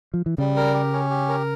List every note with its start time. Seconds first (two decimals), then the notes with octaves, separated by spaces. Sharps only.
0.14 F3
0.26 E3
0.38 C#3 G3
0.57 A#4
0.74 G4
0.93 C#4
1.10 G4
1.28 A#4